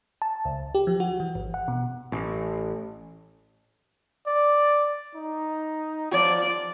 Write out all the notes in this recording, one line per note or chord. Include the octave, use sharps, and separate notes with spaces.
A5
C#2
G4
F3
F#4
E3
G#1
F#5
B2
A1
D5
D#4
F3 D5